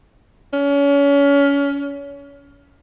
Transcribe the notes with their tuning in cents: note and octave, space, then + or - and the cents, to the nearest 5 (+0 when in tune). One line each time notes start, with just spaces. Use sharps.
C#4 +30